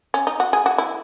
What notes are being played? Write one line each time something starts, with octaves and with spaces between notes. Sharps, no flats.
C#4
D#4
F#4
G#4
F#4
E4